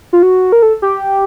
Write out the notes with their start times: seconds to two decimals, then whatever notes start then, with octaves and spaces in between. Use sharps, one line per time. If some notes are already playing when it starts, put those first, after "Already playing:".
0.13 F4
0.23 F#4
0.52 A#4
0.62 A4
0.82 G4